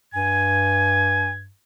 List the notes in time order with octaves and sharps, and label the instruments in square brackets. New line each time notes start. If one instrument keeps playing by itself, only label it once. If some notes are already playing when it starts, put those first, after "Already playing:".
[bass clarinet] G2 [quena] G#5 [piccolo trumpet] G#6